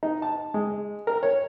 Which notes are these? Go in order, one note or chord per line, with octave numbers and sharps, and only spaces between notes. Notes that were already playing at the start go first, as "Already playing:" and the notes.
D#4
A5
G#3
A#4
C#5